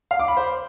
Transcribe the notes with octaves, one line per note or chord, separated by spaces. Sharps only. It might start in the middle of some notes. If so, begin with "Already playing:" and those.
F5
D6
B5
C5